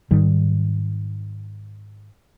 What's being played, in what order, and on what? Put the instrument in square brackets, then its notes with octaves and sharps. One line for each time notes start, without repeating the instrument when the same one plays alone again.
[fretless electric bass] G#2 D#3 G3